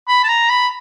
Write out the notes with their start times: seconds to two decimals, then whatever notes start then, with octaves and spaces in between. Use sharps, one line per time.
0.08 B5
0.24 A5
0.28 A#5
0.49 B5